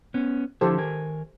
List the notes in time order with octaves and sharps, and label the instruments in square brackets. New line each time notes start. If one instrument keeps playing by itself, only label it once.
[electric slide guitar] B3 C#4
[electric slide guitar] D3 F3 E4 [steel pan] G4 A4 C5
[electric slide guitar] D#3 A#4 G#5